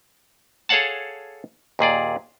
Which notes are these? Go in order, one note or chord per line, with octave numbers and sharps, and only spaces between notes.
G#4 A4 C#5 F5 F#5 A5
D#2 A#2 G#4 D5